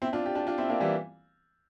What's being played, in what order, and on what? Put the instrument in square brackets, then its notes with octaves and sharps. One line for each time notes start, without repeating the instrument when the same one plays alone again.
[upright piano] C4 E4
D4 F4
G4
D4 F4
D4 F4
C4 E4
A#3 D4
E3 G3